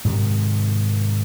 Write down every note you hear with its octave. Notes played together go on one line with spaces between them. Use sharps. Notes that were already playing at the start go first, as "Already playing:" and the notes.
G#2 C3 D#3